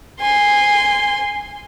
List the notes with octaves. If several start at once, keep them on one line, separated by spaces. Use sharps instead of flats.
G#5 C6